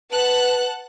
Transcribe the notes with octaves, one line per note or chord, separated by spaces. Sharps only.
B4 F#5 A5 F#6